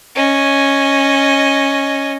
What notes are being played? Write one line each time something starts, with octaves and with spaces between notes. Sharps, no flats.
C#4 D#5